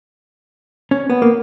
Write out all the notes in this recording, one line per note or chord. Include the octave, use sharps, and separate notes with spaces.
C#4
B3
A#3